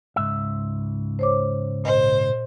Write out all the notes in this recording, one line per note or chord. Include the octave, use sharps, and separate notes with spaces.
C#2 G#2 E5
C5 C#5 D6
A#2 C5 D#5